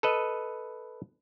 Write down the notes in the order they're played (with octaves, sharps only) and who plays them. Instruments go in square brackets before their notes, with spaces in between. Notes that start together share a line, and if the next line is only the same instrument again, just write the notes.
[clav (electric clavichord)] A4 B4 D#5